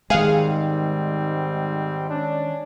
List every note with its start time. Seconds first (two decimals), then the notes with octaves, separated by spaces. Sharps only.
0.10 G#2 D#3 G3 G#3 C4 G#4 F5 F#5
2.08 C#4 D4